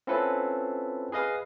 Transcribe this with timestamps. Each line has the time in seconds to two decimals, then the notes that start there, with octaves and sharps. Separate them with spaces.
0.07 C4 C#4 E4 F4 A4 B4
1.12 G#4 B4 D#5 F5 D#6